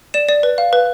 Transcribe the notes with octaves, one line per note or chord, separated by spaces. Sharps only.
D5 E7
D5
B4
F5
B4